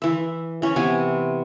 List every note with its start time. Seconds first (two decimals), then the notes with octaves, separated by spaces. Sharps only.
0.02 E3 E5
0.62 E3 C#4
0.76 C3 E3 B3 G#5